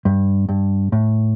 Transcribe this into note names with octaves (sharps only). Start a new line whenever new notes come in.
G2
G2
A2